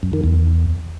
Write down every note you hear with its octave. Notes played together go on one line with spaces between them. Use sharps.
F#2
D#3
E2